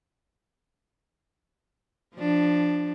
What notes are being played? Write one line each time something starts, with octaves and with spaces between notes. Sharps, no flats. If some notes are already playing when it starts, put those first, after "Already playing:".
F3 D4